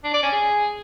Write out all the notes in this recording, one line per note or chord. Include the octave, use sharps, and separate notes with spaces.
D4
D5
C#4
G#4